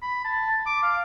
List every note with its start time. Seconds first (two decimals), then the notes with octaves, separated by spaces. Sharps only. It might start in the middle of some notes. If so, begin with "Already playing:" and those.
0.02 B5
0.25 A5
0.66 D6
0.83 F5